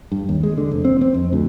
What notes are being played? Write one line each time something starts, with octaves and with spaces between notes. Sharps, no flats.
G2
D#2
G#3
D3
F1
C4
C4
F2
D2